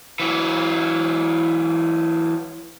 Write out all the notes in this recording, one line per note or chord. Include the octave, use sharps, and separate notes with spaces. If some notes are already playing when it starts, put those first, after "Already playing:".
E3 F#3